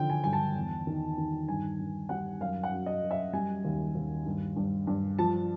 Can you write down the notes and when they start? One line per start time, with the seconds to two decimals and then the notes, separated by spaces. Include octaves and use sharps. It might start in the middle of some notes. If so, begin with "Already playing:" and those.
Already playing: D3 D#3 F3 G5
0.10 G#5
0.24 G2 G#5
0.33 A5
0.55 E2
0.87 D#3
1.18 D#3
1.48 G2 G#5
1.79 G2
2.09 G3 F#5
2.40 F#2 F5
2.63 F#5
2.71 F#2
2.86 D#5
3.02 F#2
3.11 E5
3.33 G3 G#5
3.65 D#2
3.95 D#2
4.26 G2
4.56 G2
4.87 G2
5.19 F3 A5